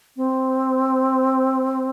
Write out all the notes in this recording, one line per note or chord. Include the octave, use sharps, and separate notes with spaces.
C4